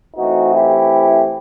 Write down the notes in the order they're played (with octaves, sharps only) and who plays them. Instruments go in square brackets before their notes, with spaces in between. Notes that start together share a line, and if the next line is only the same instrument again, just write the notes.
[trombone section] E3 A3 C4 D#4 F#4
E4 G4